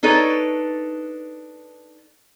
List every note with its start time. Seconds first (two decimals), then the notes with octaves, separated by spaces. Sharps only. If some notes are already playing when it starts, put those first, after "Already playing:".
0.03 D4 D#4 A4 B4 C#5